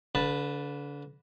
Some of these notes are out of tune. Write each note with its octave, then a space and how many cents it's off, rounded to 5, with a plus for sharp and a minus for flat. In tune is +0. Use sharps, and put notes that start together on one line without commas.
D3 -35 B4 +0 A5 +0